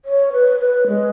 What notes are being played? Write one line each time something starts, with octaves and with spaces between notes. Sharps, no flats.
C#5
B4
B4
G#3